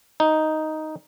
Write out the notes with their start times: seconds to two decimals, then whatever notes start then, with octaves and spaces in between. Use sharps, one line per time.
0.20 D#4